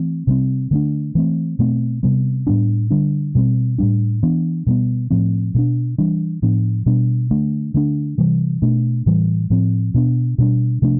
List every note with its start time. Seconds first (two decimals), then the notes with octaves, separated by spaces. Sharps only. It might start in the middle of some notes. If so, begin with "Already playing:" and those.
Already playing: E3 A3 C4
0.27 C3 G3 C4
0.71 D3 A3 D4
1.15 E3 A3 C4
1.59 B2 A3 C4
2.03 C3 G3 B3
2.47 A2 G3 B3 D4
2.91 D3 G3 D4
3.35 B2 G3 C4
3.78 A2 G3 D4
4.23 E3 B3 D4
4.67 B2 G3 B3
5.11 A2 F3 C4
5.54 B2 A3 D4
5.98 E3 G3 D4
6.42 A2 F3 B3 D4
6.86 B2 G3 B3 D4
7.31 D3 A3 D4
7.74 D3 A3 D4
8.18 C3 E3 G3
8.62 B2 A3 D4
9.06 A2 E3 G3
9.50 A2 F3 C4
9.94 B2 B3 D4
10.38 B2 G3 B3 D4
10.82 C3 F3 A3 D4